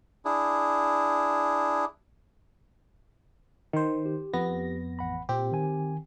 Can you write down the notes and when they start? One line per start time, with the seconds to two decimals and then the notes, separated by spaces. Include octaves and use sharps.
0.25 D4 E4 G#4
3.73 D#3 C5
4.06 G4
4.33 F2 B3 A#6
4.99 A1 F#5 B5
5.29 A#2 C4 G4
5.52 D#3 G#5